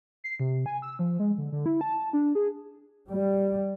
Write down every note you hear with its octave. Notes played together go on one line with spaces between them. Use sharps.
C7
C3
G#5
E6
F3
G#3
D3
D3
E4
A5
D4
G#4
G3